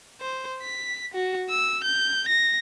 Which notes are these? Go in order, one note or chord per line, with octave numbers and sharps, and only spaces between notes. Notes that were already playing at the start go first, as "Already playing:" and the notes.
C5
B6
F#4
E6
G6
A#6